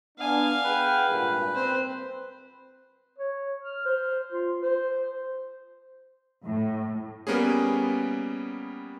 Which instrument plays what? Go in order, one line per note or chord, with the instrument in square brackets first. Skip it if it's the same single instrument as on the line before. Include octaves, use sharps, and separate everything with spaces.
[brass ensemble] B3 D4 [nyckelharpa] F5 G#5
[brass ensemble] G#4 F#5 G5 [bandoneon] B4
[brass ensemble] G#1 G2 A#2
[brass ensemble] C4 [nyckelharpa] C5
[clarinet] C#5
F6
C5
F4
C5
[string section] A2
[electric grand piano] G3 A#3 B3 C#4 G#4